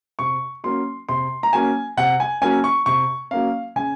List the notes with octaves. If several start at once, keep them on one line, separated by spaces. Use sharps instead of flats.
C3 C#6
F#3 A#3 C#4 C6
C3 C6
A#5
F#3 A#3 C#4 G#5
C3 F#5
G#5
F#3 A#3 C#4 G#5
C#6
C3 C#6
F#3 A#3 C#4 F5
C#3 G#5